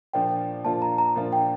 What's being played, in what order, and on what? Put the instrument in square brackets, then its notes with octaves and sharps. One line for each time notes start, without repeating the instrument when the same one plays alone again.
[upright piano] A#2 F3 A#3 D4 F4 [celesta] G5
[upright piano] A#2 F3 A#3 D4 F4 [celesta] A5
[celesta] A#5
A#5
[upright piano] A#2 F3 A#3 D4 F4
[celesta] G5